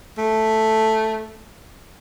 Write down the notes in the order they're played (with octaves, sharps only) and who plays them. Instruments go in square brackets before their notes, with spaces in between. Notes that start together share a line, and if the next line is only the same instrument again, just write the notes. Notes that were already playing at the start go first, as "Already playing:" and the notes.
[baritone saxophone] A3